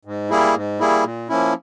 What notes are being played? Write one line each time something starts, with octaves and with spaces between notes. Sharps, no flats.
G#2
G3 A#3 E4 G#4
G#2
G3 A#3 E4 G#4
A#2
F3 A#3 C#4 E4